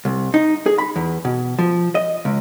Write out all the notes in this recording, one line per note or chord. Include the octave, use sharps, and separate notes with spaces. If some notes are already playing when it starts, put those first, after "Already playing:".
C2
D#4
G#4
B5
E2
B2
F3
D#5
C#2